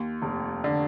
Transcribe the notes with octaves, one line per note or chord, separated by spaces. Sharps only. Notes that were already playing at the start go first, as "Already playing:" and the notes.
Already playing: D#2
F1
D3